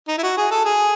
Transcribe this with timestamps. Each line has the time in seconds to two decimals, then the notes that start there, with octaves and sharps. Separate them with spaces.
0.08 D#4
0.18 E4
0.23 F#4
0.38 G#4
0.51 A4
0.65 G#4